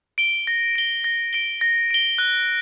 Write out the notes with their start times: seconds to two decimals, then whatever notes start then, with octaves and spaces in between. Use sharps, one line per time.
0.18 D7 G7
0.47 A#6
0.76 D7 G7
1.04 A#6
1.33 D7 G7
1.61 A#6
1.91 D7 G7
2.18 F#6